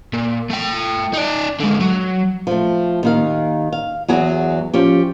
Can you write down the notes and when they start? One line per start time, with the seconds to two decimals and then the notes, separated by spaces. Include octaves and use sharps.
0.14 A#2
0.51 A3 G5
1.13 D#4 D5
1.60 D3 G#3
1.80 F#3
2.47 F3 A3
3.03 D#2 D#3 F5
3.73 F5
4.08 E2 F#3 G#4 G#5
4.74 F3 C#4 G4